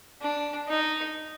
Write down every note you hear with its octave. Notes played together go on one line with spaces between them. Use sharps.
D4
D#4